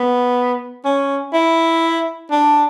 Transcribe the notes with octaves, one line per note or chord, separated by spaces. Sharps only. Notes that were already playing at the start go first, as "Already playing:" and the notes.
Already playing: B3
C#4
E4
D4